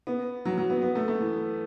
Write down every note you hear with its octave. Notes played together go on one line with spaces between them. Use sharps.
B3
F#3
F#3
B3
B3
A3
A3
E3